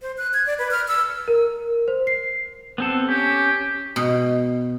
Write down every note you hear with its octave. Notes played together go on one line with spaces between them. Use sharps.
C5
F#6
G#6
D5
B4
F6
E6
A#4
C5
C7
B3 C4 A4
C#4 G4
B2